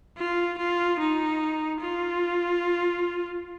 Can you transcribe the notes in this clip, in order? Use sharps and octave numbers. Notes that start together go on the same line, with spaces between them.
F4
F4
D#4
F4